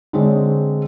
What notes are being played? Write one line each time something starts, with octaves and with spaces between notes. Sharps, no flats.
D3 G#3 C4 C#5 D5